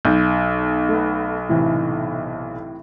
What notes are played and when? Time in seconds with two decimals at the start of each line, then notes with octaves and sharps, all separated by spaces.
0.05 B1 G6
0.89 A3 B3
1.49 A2 C3 E3